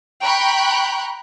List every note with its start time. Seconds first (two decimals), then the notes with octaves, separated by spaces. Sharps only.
0.21 G5 A#5 B5 C#6 F#6 G6